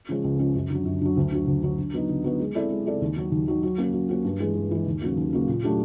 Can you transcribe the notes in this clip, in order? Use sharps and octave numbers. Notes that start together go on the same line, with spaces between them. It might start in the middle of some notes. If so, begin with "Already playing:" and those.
C#3 F3 G#3 C#4
C#2
C#3 F3 G#3 C#4
F#2
D3 F#3
F#2
D3 F#3
D2
D3 F#3
D2
D3 F#3
D3
F#3 B3 D#4
D3
F#3 B3 D#4
G#3
C4 E4 A4 D5
G#3
C4 E4 A4 D5
D#2
D#3 F#3
D#2
D#3 F#3
F#3
A#3 C#4 F#4
F#3
A#3 C#4 F#4
G2
E3 G#3
G2
E3 G#3
D#2
C#3 F#3 A#3
D#2
C#3 F#3 A#3
A#2
F#3 A3 D4 G4